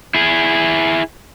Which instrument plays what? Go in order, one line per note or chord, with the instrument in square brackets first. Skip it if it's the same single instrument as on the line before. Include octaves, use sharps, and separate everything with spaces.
[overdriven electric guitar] E4 G#4